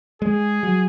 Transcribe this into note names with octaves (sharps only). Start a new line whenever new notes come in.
G#3 G#4
F#3